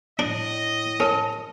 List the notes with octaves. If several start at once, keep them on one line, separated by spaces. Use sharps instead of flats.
A2 D4 D#5
C#4 A#4 A5